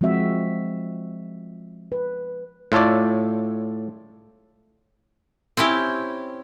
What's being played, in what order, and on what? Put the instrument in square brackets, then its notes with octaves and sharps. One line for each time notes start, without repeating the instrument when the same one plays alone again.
[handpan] F3 G#3 C4 F#4 E5
B4
[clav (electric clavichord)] A2 F4 A4 C#5 D5
[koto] C4 C#4 E4 G4